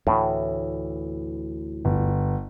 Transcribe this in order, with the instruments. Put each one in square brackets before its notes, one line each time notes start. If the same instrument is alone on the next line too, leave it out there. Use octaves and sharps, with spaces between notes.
[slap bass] D2 E3 [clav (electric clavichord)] A2
[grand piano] G1